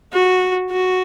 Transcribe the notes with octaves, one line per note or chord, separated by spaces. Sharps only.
F#4
F#4